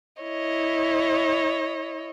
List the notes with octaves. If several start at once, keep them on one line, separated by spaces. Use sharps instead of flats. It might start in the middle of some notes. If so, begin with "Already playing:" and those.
E4 C#5 D#5